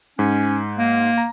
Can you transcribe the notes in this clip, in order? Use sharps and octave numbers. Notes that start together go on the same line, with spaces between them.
G#2 C#4
A#3
A#5